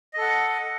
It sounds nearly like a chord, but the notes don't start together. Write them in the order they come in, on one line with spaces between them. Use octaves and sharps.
D#5 A4 F#5